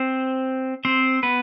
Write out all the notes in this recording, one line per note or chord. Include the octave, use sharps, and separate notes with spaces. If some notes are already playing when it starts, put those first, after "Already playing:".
Already playing: C4 C5
C4 C5
B3 B4